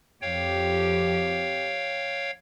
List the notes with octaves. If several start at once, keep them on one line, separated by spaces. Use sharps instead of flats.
F2 G4 C#5 F5 G5